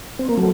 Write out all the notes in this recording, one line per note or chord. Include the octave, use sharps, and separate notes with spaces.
C4
A#3
F#3 A3